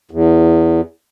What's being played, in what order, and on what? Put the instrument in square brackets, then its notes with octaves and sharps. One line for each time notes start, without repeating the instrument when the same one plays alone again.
[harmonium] E2